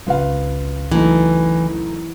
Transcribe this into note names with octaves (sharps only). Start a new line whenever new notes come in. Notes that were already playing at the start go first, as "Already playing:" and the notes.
G#1 C#2 F4 B4 F5
E3 F#3 A3 D#4